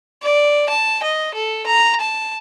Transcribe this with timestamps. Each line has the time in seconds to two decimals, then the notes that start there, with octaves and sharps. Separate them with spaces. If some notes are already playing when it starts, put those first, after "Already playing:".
0.23 D5
0.69 A5
1.03 D#5
1.34 A4
1.66 A#5
2.00 A5